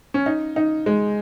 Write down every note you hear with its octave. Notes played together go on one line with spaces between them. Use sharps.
C#4
D#4
D#4
G#3